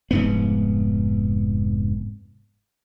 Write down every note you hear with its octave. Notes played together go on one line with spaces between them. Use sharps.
F1 G#2 B3